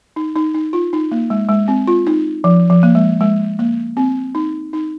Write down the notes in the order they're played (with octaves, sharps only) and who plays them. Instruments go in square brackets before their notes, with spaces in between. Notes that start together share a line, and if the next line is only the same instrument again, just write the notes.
[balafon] D#4
D#4
D#4
F4
D#4
A#3
G#3
G#3
C4
F4
D#4
F3
F3
A#3
G#3
G#3
A#3
C4
D#4
D#4